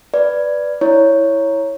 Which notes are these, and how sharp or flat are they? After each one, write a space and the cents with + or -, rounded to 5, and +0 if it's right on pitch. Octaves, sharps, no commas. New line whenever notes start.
B4 +0 D5 +0
E4 +0 C#5 +0